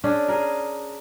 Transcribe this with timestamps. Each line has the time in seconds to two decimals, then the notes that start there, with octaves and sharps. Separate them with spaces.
0.04 C#4 D4 G#4
0.28 G#4 A#4